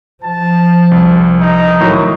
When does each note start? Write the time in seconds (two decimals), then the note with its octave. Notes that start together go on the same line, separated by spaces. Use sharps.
0.23 F3 A5
0.91 C2
1.41 D#4
1.81 A2 D#3 F#3